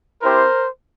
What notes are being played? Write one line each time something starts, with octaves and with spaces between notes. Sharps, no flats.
C4 E4 G4 A#4 C5